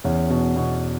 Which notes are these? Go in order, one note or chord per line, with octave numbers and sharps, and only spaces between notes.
E2 C#4
B2
B2